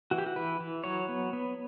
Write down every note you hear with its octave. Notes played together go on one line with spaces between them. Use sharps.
E3 F#4
G4
F#4
E3 B4
E3
F#3 C#5
B3
B3